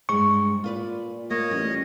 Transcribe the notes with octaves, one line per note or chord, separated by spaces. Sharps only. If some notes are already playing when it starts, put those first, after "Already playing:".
G2 G#3 C5 C#6
A#2 F4 B4 D5
A#3 C#5 D#5
A1 G3